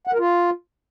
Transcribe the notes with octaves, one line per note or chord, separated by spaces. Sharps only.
F#5
A#4
F4